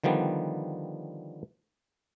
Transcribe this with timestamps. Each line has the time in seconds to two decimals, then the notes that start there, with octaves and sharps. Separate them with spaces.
0.04 D3 D#3 F3 G3 B3